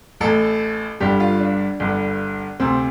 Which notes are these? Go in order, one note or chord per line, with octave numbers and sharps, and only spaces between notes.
A1 A2 A4
G1 G2 D3 G4
F4
D4
G1 G2 D3
D2 C3 C4